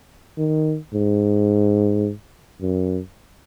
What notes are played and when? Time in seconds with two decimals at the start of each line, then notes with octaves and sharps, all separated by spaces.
0.38 D#3
0.94 G#2
2.61 F#2